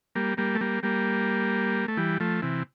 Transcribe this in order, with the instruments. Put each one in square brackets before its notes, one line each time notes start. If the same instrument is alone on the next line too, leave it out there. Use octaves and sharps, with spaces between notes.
[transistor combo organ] G3 A#3
G3 A#3
A3
G3 A#3
G3 A#3
A3
E3 G3
F3 A3
C3 E3